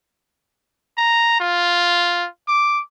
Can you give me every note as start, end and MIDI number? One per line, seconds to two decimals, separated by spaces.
0.98 1.40 82
1.40 2.27 65
2.48 2.81 86